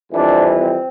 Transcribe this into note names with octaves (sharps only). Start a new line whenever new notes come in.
F2 E3 G3 C4 D4
C4